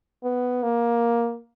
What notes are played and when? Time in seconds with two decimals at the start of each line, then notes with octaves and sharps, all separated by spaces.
0.24 B3
0.63 A#3